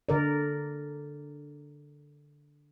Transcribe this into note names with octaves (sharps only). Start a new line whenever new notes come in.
D3 A#4 D5